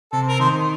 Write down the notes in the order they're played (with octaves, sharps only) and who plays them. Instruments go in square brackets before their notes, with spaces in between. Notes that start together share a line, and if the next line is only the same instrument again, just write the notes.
[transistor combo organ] C3 [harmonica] A4
[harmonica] A#4
[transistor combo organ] D#3 [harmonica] C5